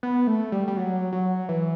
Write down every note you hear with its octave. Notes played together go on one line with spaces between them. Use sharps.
B3
A3
G3
G3
F#3
F#3
E3